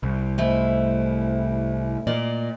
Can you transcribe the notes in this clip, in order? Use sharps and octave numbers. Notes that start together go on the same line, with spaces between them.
C2
G#2 A3 E4
A#2 A#4 D5 D#5